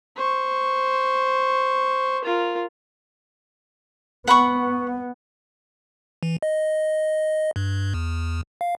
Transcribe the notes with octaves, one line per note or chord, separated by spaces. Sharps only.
C5 C#6
F4 A#4
B3 F#5 B5 C#6
E3
D#5
G2
E2
F5